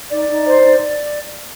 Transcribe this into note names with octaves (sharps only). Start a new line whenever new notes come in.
D#4 D5
D#4
C5
D#4